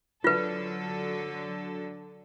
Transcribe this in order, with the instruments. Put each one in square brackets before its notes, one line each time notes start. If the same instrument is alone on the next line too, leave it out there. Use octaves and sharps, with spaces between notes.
[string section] D3 F#3 A4 [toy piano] F4 B4